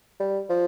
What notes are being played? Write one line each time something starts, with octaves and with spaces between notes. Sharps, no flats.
G3
F3